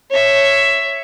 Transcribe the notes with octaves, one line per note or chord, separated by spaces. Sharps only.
C#5 E5